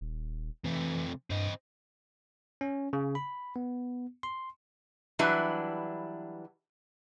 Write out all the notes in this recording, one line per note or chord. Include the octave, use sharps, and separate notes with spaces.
D#1
C3 E3 A3
G2 C4 D#5
C#4
C#3
B5
B3
C6
E3 F#3 G3 D4 E4 B4